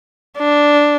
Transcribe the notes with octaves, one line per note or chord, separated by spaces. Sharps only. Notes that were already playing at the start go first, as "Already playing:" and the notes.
D4